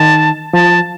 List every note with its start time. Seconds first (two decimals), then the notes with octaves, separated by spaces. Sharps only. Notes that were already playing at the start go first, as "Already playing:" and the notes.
Already playing: D#3 A5
0.53 F3 A5